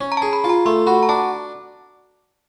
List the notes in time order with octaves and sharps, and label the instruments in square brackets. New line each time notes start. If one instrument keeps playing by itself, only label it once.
[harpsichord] C#4
[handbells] A#5
[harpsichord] G#4 [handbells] A5
[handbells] B5
[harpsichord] F4
[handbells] A#5
[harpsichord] A3 [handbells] C6
[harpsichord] F#4 [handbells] B5
[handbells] A#5
[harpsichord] D4 [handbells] A5